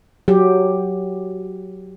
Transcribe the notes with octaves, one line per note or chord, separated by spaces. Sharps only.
F#3 G4